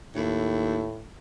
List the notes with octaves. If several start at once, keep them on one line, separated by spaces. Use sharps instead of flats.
D#2 A2